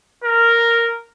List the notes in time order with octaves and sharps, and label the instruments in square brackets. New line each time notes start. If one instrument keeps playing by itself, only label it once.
[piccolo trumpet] A#4